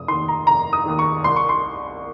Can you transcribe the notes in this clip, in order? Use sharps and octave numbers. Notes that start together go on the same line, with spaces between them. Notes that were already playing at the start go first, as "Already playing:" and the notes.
Already playing: F1 D#6
D#2 D#3 C6
A#5
F1 A#5
D#6
D#2 D#3
C#6
C2 C6
C#6
C6